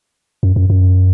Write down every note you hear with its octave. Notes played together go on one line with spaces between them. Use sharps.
F#2
F#2
F#2